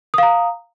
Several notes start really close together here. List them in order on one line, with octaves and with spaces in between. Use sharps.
D#6 F5 A#5